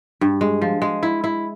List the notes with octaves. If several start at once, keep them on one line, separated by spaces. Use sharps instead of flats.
G2
G#3
F3
G#3
E4
E4